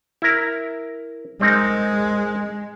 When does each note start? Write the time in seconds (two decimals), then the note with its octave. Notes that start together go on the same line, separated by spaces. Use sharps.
0.22 E4 A#4
1.41 G#3 C4 D#4 A#4